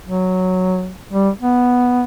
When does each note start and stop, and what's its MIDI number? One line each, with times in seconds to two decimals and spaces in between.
0.08 0.91 54
1.13 1.29 55
1.40 2.04 59